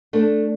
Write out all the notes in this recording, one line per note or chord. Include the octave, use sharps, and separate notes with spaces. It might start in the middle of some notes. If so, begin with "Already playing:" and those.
A3 D4